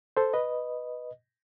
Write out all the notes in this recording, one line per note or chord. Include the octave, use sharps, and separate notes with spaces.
A4 C5
B4 D#5